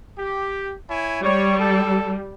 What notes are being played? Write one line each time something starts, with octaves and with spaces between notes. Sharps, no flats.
G4
E4 C#5 G#5
G3 C#5
A4